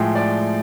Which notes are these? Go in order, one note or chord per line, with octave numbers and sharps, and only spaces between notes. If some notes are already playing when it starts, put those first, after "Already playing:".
Already playing: A2 F3 G#3 G5
D5